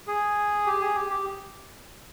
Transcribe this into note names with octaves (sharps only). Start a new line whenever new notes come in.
G#4
G4
G#4
G4
G4